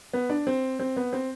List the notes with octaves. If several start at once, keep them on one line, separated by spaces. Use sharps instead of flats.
B3
D4
C4
C4
B3
C4